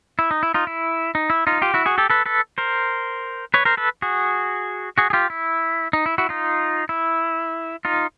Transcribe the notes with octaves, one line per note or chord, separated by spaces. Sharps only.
E4
D#4
E4
D#4 F4
E4
D#4
E4
D#4 F4
F4 G4
E4 F#4
F#4 G#4
G4 A4
A4 B4
A4 B4
A#4 C5
B4 C#5
A#4 C5
A4 B4
F#4 G#4
F#4 G#4
G#4
F4 G4
E4
D#4
E4
E4 F#4
D#4 F4
E4
D#4 F4